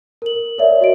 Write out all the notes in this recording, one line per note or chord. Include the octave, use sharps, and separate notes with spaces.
A#4 F#7
A#4 C#5 D5 E5
F#4 D#5 D7